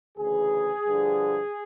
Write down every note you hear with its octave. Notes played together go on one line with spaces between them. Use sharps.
D2 C#3 E3 G#4
G2 D3 F3